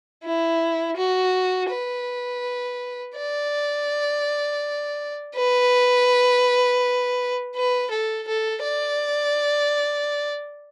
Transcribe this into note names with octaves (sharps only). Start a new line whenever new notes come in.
E4
F#4
B4
D5
B4
B4
A4
A4
D5